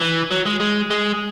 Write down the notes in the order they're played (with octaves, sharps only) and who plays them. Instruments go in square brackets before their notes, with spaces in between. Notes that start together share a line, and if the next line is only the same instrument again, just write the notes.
[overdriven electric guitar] E3
F#3
G#3
G#3
G#3